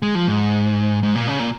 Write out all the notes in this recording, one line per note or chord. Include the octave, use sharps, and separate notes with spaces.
G#3
F3
G#2
G#2
A#2
C#3
A#2